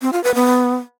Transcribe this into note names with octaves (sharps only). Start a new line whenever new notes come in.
C4
F4
B4
B3